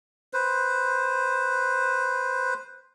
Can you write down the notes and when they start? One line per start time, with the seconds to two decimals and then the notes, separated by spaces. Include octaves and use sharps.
0.33 B4 C5